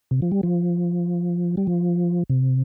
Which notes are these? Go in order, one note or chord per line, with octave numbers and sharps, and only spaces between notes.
C3
F3
G3
F3
G3
F3
C3